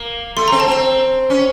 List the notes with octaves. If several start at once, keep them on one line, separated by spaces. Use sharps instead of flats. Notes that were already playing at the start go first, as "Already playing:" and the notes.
Already playing: A#3
A3 C6
C4 A#5
A5
C4 A#5
C#4